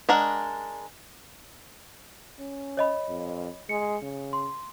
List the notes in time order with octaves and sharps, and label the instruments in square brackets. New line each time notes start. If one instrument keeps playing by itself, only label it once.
[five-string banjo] G#3 D4 A#4 F#5
[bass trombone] C#4
[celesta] C#5 D#5 B5
[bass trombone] F2
[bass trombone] G#3 [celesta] C#7
[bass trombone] C#3
[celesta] C6